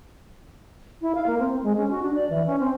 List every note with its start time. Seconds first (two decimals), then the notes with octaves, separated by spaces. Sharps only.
1.02 E4
1.15 F5
1.26 A#3
1.39 C4
1.63 G#3
1.77 C#4
1.91 F#4
2.02 D4
2.15 D5
2.29 E3
2.46 C#4
2.59 C4